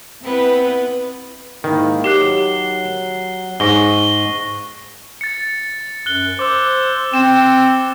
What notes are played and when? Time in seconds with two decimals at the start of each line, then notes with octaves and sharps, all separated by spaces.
0.24 B3 C4 E4 B4
1.64 G#2 D#3 A#3 E4
2.04 F#3 G4 F#6 C7 G7
3.60 G#2 C#6 A#6 G7
5.21 A6 C#7
6.06 F#2 F#6 G7
6.39 C5 D6 E6
7.14 C4 E7